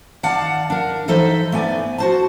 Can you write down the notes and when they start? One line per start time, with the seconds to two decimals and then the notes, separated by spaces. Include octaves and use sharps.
0.23 D#3 D5 F5 F#5 A5
0.70 D4 A#4
1.08 E3 D#4 A4 C5 E5
1.52 A3 B3 D5 G#5
1.98 F#4 C5 A5